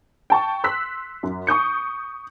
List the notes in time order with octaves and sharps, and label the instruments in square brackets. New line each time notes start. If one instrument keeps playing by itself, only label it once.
[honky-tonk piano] G5 A5 C#6
C6 E6 F#6 B6
F#2
C#6 D#6 G6 C#7